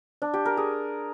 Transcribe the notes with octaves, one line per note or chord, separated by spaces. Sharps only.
D4
G4
A#4
G#4